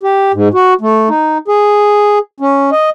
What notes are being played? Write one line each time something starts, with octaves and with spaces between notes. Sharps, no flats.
G4
G#2
F#4
A3
D#4
G#4
C#4
D#5